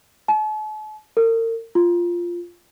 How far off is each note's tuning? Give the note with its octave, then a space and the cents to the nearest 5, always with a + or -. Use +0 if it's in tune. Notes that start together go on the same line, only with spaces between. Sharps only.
A5 -45
A#4 -40
F4 -5